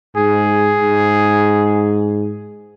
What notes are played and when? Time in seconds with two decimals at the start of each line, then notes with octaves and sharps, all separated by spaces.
0.16 G#2 G#4
0.80 G#2